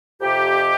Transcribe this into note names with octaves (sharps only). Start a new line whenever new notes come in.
F2 C3 G4